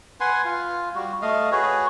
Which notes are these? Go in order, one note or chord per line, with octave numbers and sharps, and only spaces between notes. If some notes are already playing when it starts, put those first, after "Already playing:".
B4 F#5 G#5 C6
F4
G3 F#4
A3 D#5 F5
F#4 G#4 B4 C#5